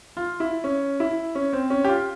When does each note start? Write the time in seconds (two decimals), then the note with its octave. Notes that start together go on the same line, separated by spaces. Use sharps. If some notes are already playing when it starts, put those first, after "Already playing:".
0.17 F4
0.40 E4
0.64 C#4
1.00 E4
1.35 C#4
1.53 C4
1.70 C#4
1.84 G4
1.89 F4